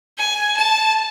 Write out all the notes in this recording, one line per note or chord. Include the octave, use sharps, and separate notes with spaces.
G#5
A5